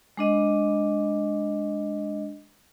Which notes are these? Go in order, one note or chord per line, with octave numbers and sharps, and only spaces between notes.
G#3 D4 D#5